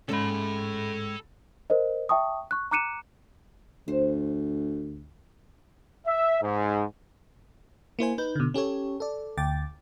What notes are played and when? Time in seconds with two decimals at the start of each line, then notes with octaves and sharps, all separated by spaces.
0.09 G#2 G#3 C#4 A4 B5
1.70 A#4 C5 D#5
2.09 E5 G5 A5 C#6 D#6
2.51 C#6 F#6
2.71 A#5 D6 F#6 C#7 D#7 E7
3.88 D2 C5
6.07 E5
6.42 G#2
7.99 A#3 E4 C5 G#5
8.18 D#4 B4 G6
8.36 B2 D3
8.54 C#4 G4 A4 C#5
9.00 A4 D5
9.38 D2 G5 D6 A6